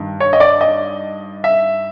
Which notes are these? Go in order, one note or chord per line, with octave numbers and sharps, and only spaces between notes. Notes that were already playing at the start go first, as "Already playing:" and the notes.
Already playing: G2 D#3
C#5
D#5
D5
D#5
E5